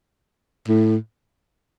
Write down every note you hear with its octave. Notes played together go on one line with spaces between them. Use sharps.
A2